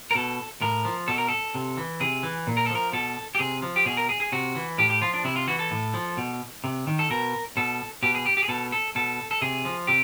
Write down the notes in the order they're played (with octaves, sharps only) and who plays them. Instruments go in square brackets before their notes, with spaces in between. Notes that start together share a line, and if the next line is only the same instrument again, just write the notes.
[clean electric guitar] A#4
B2 A4
A2 A#4
F3
B2 A4
A#4
A4
C3
E3
C3 G#4
E3
A#2
A#4
A4
F3
A#4
B2 A4
G4
C3 G#4
F3
G4
B2 G#4
A#4
G#4
G#4
C3 F#4
E3
A2 G4
G4
F3 F4
D4
C3 E4
F4
E3 F#4
A4
A2
F3
B2
C3
D#3
A4
B2 A#4
B2 A4
B2 G4
G#4
G4
G4
G#4
B2 A4
A4
B2 A4
A4
C3 G#4
F3
C3 G4